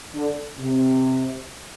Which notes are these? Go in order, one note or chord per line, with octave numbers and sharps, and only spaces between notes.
D3
C3